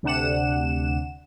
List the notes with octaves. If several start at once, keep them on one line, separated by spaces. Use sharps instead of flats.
D2 C3 D4 F#5 E7